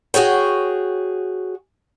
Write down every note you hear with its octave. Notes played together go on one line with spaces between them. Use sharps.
F#4 G#4 C#5 G5